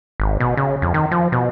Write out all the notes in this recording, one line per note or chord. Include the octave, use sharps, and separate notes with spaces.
G#1
B2
C#3
F2
D#3
F3
B2